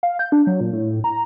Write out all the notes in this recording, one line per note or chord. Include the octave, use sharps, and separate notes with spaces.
F5
G6
D4
F#3
A#2
A2
A#5